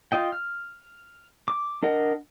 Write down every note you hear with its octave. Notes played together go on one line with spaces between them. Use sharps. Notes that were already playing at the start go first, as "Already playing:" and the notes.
F4 D#5 G5
F6
D6
D4 A#4 D#5 F#5